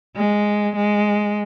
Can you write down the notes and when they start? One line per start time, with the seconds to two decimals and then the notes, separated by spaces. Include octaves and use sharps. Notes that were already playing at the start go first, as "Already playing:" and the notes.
0.16 G#3
0.76 G#3